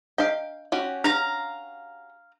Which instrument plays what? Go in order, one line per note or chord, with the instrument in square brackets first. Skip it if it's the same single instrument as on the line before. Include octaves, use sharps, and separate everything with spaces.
[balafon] D4 D#5 [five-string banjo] F5 G5
[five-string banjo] C#4 F#4 G4
[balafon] D4 [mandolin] F5 A#5